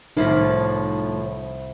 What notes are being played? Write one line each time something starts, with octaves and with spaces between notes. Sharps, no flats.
C2 A2 D#3 F3 A#3 B6